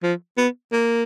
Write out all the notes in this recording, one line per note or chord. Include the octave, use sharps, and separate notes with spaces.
F3
B3
A#3